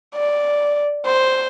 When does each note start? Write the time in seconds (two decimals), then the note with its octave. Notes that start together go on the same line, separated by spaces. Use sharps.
0.15 D5
1.05 C5